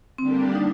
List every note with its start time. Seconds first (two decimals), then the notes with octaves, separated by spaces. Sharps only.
0.18 D3 G3 A#3 C4 D4 G4
0.55 D#4